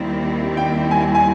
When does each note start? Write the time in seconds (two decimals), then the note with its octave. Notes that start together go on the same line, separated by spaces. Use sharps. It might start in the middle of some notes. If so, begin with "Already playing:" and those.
Already playing: D#2 D#3 G3 C4 E4
0.57 G5
0.91 G#5
1.15 G#5